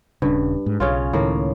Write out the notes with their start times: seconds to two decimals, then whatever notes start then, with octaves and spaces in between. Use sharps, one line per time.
0.22 D#1 G2 C#3
0.66 G#2
0.80 B1 C#3 C#4 F4
1.13 C#2 A2 D#3 A#3